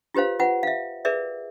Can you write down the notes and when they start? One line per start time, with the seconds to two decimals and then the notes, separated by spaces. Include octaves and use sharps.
0.15 F4 G4 B4 C5 F5
0.39 F4 B4 F#5
0.63 E5 F5
1.05 G#4 A#4 B4 D5 E5